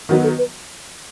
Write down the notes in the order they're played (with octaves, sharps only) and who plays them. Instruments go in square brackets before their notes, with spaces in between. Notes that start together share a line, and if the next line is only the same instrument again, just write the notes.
[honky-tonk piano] D#3 F#3 B3 D#4 [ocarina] F#4
[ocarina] A4
B4